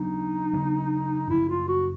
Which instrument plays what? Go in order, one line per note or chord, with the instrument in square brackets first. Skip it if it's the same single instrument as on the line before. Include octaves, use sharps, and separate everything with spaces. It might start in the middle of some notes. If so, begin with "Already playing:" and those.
Already playing: [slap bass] C#3 F#3 B3 D4 [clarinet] D#4
[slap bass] C#3 F#3 B3 D4
[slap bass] F#2 C#3 F3 [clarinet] E4
[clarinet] F4
F#4